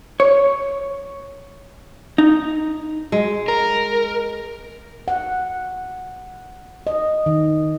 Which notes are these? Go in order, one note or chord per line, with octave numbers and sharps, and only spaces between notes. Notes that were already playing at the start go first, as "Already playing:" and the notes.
C#5
D#4
G#3
A#4
F#5
D#5
D#3